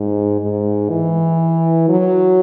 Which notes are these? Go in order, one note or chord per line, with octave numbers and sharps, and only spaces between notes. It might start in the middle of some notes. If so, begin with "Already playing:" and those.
Already playing: G#2
G#2
E3
F#3